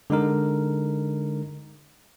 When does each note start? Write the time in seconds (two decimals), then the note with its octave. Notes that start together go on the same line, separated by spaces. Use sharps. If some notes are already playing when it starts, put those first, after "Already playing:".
0.10 D3 G#3 D#4 A#4